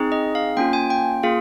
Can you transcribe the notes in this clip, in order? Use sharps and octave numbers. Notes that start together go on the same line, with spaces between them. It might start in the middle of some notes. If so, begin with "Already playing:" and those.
Already playing: C4 D#4 G#4
D#5
F5
A#3 C#4 F4 G5
G#5
G5
A#3 F4 G#4 F5